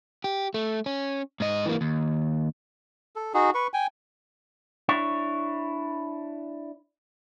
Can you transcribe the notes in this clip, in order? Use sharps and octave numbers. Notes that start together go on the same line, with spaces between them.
G4
A3
C#4
G#2 D#5
E3 A#3
D#2
A4
D#4 F#4 G#4
B4 C#6
G5 G#5
D4 E4 C#5